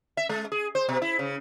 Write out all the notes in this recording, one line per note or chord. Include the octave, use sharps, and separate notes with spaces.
E5
G#3
G#4
C5
B2
E4
C#3